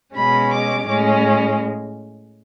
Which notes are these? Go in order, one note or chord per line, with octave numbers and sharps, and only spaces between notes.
B2 G#3 C#4 B5
D6
A2 G#3 C#4